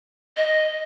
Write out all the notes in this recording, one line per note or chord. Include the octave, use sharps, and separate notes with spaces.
D#5